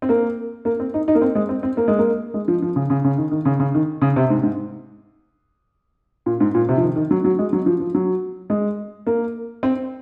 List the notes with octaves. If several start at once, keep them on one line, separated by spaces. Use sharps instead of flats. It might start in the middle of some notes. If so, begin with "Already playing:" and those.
C4
A#3
A#3
C4
D#4
D#4
A#3
C4
G#3
C4
C4
A#3
G#3
A#3
G#3
F3
F3
C#3
C#3
C#3
D#3
D#3
C#3
C#3
D#3
C#3
C3
G#2
G#2
A#2
G#2
A#2
C3
F3
D#3
D#3
F#3
F#3
G#3
F#3
F3
F3
F#3
G#3
A#3
C4